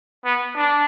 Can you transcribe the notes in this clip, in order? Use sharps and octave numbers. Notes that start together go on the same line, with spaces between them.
B3
D4